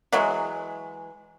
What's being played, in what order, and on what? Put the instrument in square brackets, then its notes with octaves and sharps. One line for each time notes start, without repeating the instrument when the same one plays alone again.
[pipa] E3 F#3 G#3